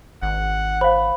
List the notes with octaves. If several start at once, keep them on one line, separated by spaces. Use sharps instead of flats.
G#1 F#5
C5 F5 B5